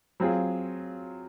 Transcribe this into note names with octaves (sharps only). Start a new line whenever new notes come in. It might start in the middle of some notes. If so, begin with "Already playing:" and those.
F#3 C4 F4 G#4